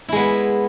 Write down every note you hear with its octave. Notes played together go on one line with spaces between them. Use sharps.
G#3 B3 E4